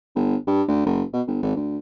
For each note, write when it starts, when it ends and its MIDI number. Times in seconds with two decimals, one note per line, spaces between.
0.15 0.36 31
0.47 0.63 43
0.68 0.82 38
0.86 1.03 30
1.13 1.22 47
1.27 1.42 31
1.42 1.53 32
1.56 1.77 38